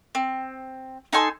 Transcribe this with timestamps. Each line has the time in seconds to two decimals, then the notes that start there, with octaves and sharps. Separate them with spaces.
0.15 C4
1.13 D#4 A4 G#5 C6